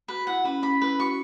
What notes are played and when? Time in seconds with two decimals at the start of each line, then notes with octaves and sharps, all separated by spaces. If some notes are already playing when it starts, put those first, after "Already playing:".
0.08 F#4 B4
0.27 E4 F#5
0.45 C#4 B4
0.63 C#4 B5
0.81 E4 B4
0.99 F#4 C#6